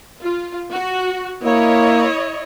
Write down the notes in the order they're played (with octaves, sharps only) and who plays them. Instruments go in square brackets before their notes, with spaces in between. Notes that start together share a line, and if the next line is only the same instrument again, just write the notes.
[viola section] F4
F#4
[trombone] A#3 [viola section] E4 C#5 D#5